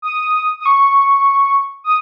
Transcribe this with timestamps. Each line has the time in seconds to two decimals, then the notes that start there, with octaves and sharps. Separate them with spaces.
0.02 D#6
0.60 D#6
0.66 C#6
1.84 D#6